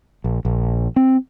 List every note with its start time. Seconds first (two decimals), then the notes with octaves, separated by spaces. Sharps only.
0.24 A#1
0.45 A#1
0.96 C4